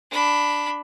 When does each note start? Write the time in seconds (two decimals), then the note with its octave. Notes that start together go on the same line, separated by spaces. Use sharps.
0.10 D4 B5